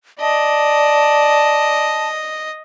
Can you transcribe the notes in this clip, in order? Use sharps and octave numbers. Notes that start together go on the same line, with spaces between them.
D5 D#5 A5